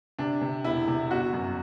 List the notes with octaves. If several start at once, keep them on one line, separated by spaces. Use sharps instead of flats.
C3 D4
C3
E1 E4
C3
G1 F#4
F#2